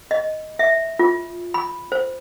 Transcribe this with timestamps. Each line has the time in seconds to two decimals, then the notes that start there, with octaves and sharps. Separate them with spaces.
0.11 D#5
0.59 E5
0.99 F4
1.54 B5
1.92 C5